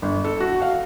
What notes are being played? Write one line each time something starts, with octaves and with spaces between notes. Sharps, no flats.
G1
A4
F#4
F5